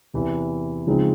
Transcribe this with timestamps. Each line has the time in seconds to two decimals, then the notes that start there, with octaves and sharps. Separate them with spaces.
0.14 E2 C3 E3
0.87 C#3 F3 G#3 C4 D#4